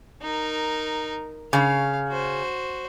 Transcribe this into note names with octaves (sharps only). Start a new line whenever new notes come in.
D#4 A#4
C#3 F5
F#4 C5